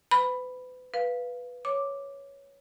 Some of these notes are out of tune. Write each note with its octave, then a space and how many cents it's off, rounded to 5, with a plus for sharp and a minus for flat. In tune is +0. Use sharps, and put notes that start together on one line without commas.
B4 +35 B5 +0
B4 +0 F5 +0
C#5 +0 D6 +0